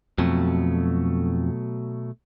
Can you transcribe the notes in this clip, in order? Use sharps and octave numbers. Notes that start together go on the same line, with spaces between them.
F2 B2 F#3 A3